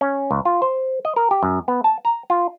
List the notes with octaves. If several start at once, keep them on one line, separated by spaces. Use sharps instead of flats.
C#4
C#2
F4
C5
D#5
A#4
G4
F#2
B3
A5
A#5
F4